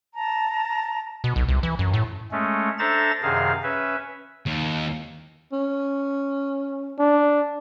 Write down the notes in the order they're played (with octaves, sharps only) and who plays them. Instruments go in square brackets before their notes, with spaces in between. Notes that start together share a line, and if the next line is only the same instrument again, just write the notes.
[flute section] A5 A#5
[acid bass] B2
B1
C2
E3
F#2
A2
[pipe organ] G#3 A3 C#4
D4 A4 C5 E5 A#5 A6
F#2 C3 D#3 G#4 F5
C#4 B4 E5
[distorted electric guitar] D#2
[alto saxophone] C#4
[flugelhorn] D4